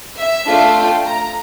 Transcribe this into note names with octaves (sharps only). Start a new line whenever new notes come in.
E5
A3 D4 F4 A4
G5
A#5